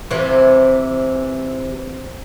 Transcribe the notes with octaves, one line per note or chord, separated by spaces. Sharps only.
C3 E3